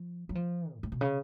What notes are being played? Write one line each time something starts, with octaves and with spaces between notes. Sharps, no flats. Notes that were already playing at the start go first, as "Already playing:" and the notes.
Already playing: F3
F#3
F3
G#2
A2
B2
C#3